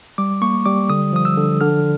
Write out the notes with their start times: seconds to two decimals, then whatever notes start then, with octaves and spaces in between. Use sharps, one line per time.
0.18 G3 D6
0.42 A#3 C#6
0.66 G3 D6
0.89 D3 D#6
1.13 F3 D#6
1.25 E6
1.37 D3
1.61 D3 F6